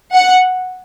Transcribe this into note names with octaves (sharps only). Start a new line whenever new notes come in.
F#5